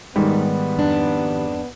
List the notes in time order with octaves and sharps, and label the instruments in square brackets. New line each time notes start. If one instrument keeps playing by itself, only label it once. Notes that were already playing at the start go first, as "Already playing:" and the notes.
[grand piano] G#2 G3 [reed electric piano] D#3 G4 [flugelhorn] B3
[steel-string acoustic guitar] F2 D4